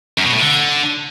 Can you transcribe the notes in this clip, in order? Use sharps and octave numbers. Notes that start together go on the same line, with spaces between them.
F#2
B2
A2
D3